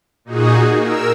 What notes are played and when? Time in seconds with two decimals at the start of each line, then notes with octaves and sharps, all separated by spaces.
0.25 A#2 D#4 F#4 G#4
0.78 A#4 E6